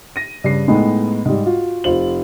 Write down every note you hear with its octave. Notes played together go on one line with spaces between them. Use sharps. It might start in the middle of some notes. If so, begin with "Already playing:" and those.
A#6 D#7
G2 C#3 C7
A2 G#3 B3 D#4
G#2 G3
F4 F#4
F1 F4 C5 F#7